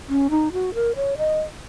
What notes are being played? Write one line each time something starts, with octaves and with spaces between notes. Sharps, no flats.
C#4
D#4
F#4
A#4
C#5
D#5